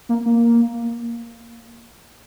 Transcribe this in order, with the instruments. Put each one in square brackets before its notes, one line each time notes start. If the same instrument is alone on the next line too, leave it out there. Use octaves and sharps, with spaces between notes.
[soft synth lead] A#3
A#3